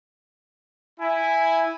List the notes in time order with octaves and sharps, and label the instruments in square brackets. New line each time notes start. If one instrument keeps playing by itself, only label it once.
[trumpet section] E4 G#5